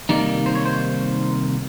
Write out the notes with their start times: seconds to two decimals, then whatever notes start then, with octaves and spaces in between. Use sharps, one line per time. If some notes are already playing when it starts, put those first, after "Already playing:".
0.09 C3 D#3 G3 A#3 D#4 D5
0.46 C5
0.55 C#5
0.66 C5